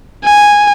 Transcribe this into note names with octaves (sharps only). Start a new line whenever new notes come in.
G#5